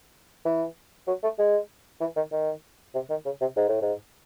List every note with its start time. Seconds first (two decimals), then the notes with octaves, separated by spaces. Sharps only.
0.45 E3
1.08 F#3
1.23 A3
1.39 G#3
2.01 E3
2.16 D#3
2.32 D#3
2.95 C3
3.10 D#3
3.26 C#3
3.41 C3
3.57 G#2
3.69 A2
3.81 G#2